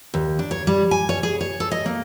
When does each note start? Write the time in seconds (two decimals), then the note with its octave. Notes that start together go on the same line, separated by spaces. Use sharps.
0.14 D#2
0.39 D4
0.51 C#5
0.67 G3
0.91 G#5
1.09 C#5
1.23 G#4
1.41 C#5
1.60 A4
1.71 D#5
1.86 A#3